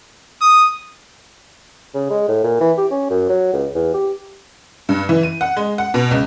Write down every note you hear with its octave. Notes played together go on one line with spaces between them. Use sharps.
D#6
C#3
G#3
A2
A#2
E3
G4
C#4
F#2
F#3
C#2
E2
G4
G2
E3
D#7
F#5
G#3
F#5
B2
C#2